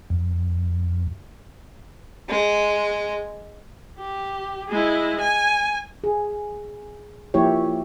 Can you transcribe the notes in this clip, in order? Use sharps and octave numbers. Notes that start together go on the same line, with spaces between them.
F2
G#3
G4
G#3 E4
G#5
G#4
F3 A#3 E4 G4 C#5